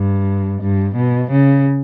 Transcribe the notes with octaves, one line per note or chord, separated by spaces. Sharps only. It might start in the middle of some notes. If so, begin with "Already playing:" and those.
Already playing: G2
G2
B2
C#3